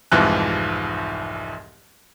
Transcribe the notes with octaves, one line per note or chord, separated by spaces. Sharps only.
F1 C2 G#2 E3 F3 F#6